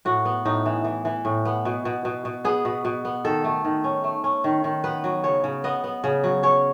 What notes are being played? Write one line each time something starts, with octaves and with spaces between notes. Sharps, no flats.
A2 F#4
B3
A2 D#4
E3
E3
E3
A2
B3
B2
B2
B2
B2
B3 G#4
B2
B2
B3
D#3 A4
A3
D#3
C#4
A3
C#4
D#3
D#3
B3 B4
F#3
C#3 C#5
C#3
B3 D#5
B3
C#3
F#3
C#4 C#5